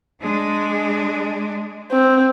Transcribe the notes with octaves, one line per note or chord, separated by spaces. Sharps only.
G#3 D4
C4